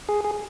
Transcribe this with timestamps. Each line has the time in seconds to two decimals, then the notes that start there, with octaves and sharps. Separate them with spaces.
0.09 G#4
0.24 G#4